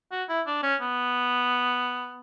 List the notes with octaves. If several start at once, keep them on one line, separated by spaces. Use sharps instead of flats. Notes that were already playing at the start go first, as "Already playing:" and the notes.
F#4
E4
D4
C#4
B3